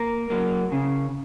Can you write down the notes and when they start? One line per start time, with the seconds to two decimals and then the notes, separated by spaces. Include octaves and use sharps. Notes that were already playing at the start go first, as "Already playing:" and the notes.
Already playing: A#3 A#4
0.30 F#3 A#3
0.72 C#3